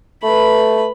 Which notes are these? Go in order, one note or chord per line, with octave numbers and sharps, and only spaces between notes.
A3 B4 B5